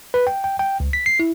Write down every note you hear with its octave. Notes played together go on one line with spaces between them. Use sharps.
B4
G5
G5
G5
C#2
B6
C7
E4